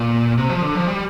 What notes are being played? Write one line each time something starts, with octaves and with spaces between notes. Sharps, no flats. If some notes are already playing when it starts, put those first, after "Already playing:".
Already playing: A#2
C3
F3
D3
F3
G3